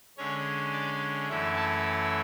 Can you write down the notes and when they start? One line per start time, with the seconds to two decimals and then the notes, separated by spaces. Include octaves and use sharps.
0.17 D3 G#3 C#4 C#5
0.72 D5
1.29 F#2 E3 A3 C#4 E4
1.56 A5